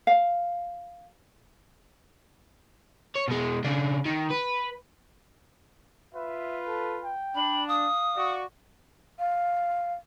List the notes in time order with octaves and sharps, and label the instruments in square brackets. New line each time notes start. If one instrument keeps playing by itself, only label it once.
[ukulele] F5
[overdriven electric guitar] C#5
B2 G#3
C#3 D4
D#3
B4
[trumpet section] F4 B4 [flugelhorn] E5
[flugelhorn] A4
G5
[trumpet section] D4 [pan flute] B5
[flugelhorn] F5 [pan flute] D#6
[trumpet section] F#4 D5 C#6
[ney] F5